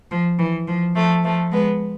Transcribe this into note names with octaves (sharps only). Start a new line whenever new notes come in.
F3
E3
F3
F3 A3
F3 A3
G#3 B3